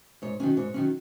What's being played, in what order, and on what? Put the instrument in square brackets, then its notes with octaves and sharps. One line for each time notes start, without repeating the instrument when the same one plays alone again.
[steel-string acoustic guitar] G#2 C#5
D#3 F#3 C#4
G#2 C#5
D#3 F#3 C#4